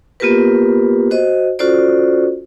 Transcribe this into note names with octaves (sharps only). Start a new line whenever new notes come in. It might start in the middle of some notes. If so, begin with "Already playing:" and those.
A#3 B3 F4 G4 A#4 B4
F#4 C5 D#5
C#4 F4 F#4 A4 C5 D5